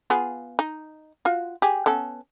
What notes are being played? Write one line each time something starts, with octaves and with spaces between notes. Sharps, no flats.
B3 F4 G#4
D#4
F4 F#4
G4 G#4
B3 C#4 A4